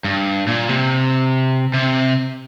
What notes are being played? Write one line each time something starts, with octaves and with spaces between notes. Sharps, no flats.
G2
A#2
C3
C3